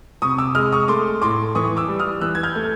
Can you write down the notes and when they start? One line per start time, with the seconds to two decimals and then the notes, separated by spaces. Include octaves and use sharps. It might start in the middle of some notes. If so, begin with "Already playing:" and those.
0.22 C3 C#6 D#6
0.38 D6 E6
0.55 G#3 D#6 F6
0.72 C#6 D#6
0.88 A3 C6 D6
1.22 A2 C6 D6
1.55 E3 C#6 D#6
1.77 D6 E6
1.88 G3
1.99 D#6 F6
2.21 E3 E6 F#6
2.35 G#6
2.43 F6 G6
2.55 A3